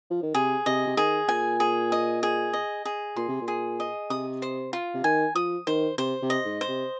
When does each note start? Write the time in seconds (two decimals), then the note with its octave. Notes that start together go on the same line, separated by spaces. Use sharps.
0.11 F3
0.23 D#3
0.34 C3 G#4
0.66 C3 D#5
0.87 C3
0.97 D#3 G#4
1.29 A#2 G#5
1.60 G#4
1.92 D#5
2.23 G#4
2.53 D#5
2.85 G#4
3.16 A#2 C6
3.29 C3
3.41 A#2
3.48 G#4
3.80 D#5
4.10 C3 D#6
4.42 C5
4.73 F4
4.94 C3
5.04 D#3 G#5
5.35 F3 D#6
5.67 D#3 C5
5.98 C3 C5
6.22 C3
6.30 D#5
6.45 G#2
6.61 C5
6.68 C3